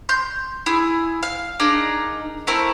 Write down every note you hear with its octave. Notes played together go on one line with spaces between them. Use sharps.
C6 G6
E4 G#4
F5
D4 D#4 G#4 A#4
A3 C4 E4 A#4